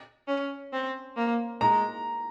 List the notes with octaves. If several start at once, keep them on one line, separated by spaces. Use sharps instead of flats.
C#4
C4
A#3
G#3 A#5